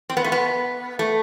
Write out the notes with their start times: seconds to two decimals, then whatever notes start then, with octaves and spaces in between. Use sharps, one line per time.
0.10 C4
0.17 B3
0.24 A3
0.32 B3
0.99 A3